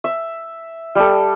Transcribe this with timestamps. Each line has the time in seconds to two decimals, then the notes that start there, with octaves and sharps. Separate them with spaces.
0.04 E5
0.95 G3 A4